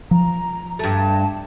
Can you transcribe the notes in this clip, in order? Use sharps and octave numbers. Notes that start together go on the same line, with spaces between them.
F3 A#5
G2 A3 A5